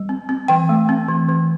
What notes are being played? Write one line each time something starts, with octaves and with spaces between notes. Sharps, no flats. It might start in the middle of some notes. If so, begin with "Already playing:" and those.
Already playing: G3
C4
C4
E3 G5
A3
C4
E3
E3